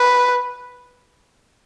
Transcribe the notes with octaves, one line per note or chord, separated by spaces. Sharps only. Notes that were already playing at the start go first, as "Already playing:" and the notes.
Already playing: B4